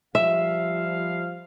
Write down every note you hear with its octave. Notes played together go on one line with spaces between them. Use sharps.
F3 G3 E5 F5